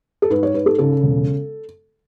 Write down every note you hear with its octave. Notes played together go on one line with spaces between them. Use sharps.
A4
G#2 B4
C#5
G#2 B4
A4
C#3 A4
E1